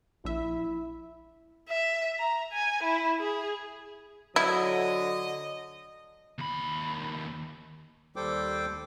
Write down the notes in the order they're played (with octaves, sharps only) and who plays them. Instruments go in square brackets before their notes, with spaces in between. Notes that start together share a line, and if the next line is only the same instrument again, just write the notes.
[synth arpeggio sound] A#1 E5 [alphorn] E4
[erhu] E5
A#5
G#5
E4
G#4
[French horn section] D3 F#3 [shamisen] E4 [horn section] D#5
[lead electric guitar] D#2 B5
[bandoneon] D#2 G3 A4 C5 G5 D6